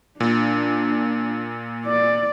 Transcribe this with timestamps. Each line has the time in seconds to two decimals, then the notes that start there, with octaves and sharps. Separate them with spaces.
0.20 A#2 D4
1.86 D5